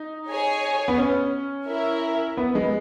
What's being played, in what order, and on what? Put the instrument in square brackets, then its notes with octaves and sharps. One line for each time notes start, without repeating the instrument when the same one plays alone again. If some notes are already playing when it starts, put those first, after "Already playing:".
Already playing: [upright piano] D#4
[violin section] G#4 C#5 G#5
[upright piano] B3
C#4
[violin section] E4 A#4 E5
[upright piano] B3
G#3